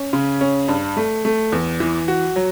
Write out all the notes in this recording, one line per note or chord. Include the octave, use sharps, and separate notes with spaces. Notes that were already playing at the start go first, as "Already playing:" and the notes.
Already playing: C#4
C#3
C#4
G2
A3
A3
E2
E3
F#4
F#3